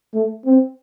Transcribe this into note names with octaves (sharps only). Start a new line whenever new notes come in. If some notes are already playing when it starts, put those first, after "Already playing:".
A3
C4